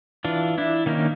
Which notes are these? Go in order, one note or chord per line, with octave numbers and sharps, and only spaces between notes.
E3 D4 F4
D4 E4
D#3 A#3 C#4 D#4